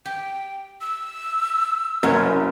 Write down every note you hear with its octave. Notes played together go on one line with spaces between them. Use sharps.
G4 G5
E6
F#1 C2 F#2 C#4 A#4 C#5